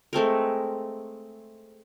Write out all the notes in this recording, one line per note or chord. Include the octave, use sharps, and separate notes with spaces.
G#3 A3 C4 A#4